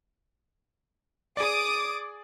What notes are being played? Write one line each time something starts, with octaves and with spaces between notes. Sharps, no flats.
G#4 D5 D6 D#6